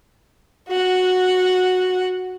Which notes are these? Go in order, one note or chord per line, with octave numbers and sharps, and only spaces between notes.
F#4 F#5